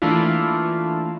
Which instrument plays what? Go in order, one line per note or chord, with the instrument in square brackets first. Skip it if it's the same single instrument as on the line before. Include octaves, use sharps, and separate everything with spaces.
[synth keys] E3 A3 A#3 D4 E4 F4